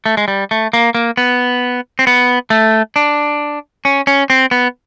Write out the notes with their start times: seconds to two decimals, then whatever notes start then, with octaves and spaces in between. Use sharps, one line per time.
0.06 A3
0.17 G#3
0.28 G3
0.51 A3
0.73 A#3
0.95 A#3
1.17 B3
1.99 C4
2.07 B3
2.50 A3
2.96 D4
3.85 C#4
4.07 C#4
4.30 C4
4.51 B3